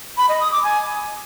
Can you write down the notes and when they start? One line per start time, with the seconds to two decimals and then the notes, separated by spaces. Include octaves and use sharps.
0.18 B5
0.29 D#5
0.40 D#6
0.52 D6
0.63 G#5